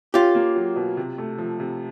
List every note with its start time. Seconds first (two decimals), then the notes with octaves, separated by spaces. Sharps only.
0.14 C#4 F4 G4
0.35 A#3
0.56 F#3
0.76 B2
0.97 C3
1.18 A3
1.38 F3
1.60 C3